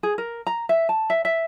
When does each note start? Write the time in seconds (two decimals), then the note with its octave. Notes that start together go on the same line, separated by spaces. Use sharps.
0.03 G#4
0.18 A#4
0.47 A#5
0.69 E5
0.89 A5
1.10 E5
1.25 E5